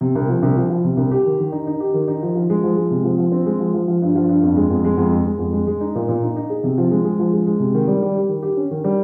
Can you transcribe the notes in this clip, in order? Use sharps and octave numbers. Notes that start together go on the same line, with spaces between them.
C3
C2
F3
C2
F3
F3
C3
C2
G4
D#3
D#3
D#4
D#4
G4
D#3
D#4
F3
F3
G#3
F3
G#3
C3
F3
F3
C4
G#3
F3
F3
F3
G2
F3
G2
F2
G#3
F2
G#3
F2
G#3
G#3
F2
G#3
G#3
D#4
A#2
A#2
D#4
D#4
G#4
C3
F3
G#3
G#3
F3
G#3
G#3
C3
D#3
G3
G3
G4
D#3
G4
C#4
D#3
G3